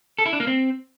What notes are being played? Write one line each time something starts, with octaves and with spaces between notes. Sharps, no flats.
A4
E4
D4
A#3
C4